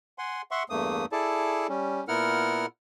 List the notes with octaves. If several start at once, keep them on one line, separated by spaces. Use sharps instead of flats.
F#5 G#5 C6
E5 F#5 C6 C#6
E2 G2 A3 A#3 D#6
E4 G#4 A4 D5 A5
G3 C#4
A#2 B3 E4 A#4 F#5 F6